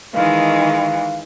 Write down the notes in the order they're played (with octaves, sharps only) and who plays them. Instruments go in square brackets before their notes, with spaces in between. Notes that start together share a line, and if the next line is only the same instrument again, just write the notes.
[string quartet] D#3 E3 G#3 [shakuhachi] F5